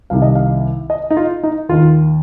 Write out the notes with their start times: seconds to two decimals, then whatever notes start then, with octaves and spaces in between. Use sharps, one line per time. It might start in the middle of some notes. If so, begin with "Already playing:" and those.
0.10 C2 C3 D#3 F5
0.22 D#5
0.35 F5
0.90 D#5
1.10 D#4
1.17 F4
1.43 D#4
1.69 D#2 D#3 F4